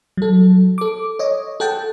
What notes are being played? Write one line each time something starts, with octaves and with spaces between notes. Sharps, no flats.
F#3 A4
A4 D6
C#5 D#5
A4 F#5 G5 A5